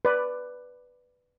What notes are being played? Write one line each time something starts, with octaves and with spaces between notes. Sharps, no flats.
B4 D5